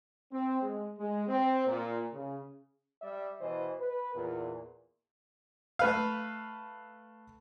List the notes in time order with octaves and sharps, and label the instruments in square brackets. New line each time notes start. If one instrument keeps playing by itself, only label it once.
[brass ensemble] C4
G#3
G#3
C4
A#2
C#3
G3 D5 E5
B2 E3 C5 D#5
B4
E2 A#2
[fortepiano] A3 B4 F5